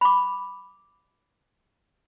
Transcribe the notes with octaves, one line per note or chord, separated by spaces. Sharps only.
B5 D6